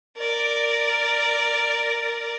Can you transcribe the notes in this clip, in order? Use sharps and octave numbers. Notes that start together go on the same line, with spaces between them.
A#4 D5